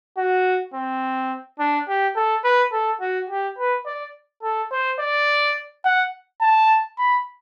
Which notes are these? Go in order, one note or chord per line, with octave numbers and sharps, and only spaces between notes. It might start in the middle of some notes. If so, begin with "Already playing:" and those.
F#4
C4
D4
G4
A4
B4
A4
F#4
G4
B4
D5
A4
C5
D5
F#5
A5
B5